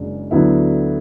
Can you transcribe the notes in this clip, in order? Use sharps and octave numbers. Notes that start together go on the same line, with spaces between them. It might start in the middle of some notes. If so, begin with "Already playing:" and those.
Already playing: F#1 F#2 C#3 G#3 D4
D2 D3 F#3 B3 E4